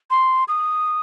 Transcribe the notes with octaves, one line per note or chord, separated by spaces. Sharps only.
C6
D#6